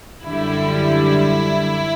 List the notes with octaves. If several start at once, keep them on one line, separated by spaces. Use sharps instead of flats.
F#2 D3 G3 E4